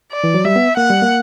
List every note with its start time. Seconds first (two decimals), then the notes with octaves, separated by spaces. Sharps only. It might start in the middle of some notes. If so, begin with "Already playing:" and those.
0.12 D5
0.24 E3
0.34 F#3
0.45 G3 E5
0.56 B3
0.77 A#3 F#5
0.90 G3
1.02 A#3